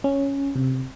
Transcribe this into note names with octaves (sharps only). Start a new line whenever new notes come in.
C#4
C3